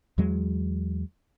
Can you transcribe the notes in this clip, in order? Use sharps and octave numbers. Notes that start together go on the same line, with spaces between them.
E2 F#3 G#3